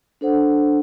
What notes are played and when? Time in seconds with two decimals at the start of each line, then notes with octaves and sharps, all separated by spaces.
0.21 D4 A4 C5 F#5